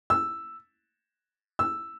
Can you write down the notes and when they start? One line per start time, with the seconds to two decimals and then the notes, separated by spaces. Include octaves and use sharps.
0.10 E6
1.59 E6